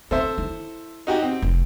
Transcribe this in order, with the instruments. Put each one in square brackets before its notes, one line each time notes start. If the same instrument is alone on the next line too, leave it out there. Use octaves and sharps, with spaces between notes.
[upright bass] C4 [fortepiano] A4 C5 E5
[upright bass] E4
[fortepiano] D#4 F#4 G4
C4
[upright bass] F1